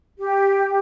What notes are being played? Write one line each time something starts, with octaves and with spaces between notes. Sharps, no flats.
G4